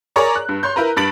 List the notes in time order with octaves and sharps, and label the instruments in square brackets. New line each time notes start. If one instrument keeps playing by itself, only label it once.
[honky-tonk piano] G#4 A#4 C#5 D5 A#5 C#6
F#6
G2
C#5 C6 G6
E4 A#4 B4 A#5
G2 B5 A6 D7 F#7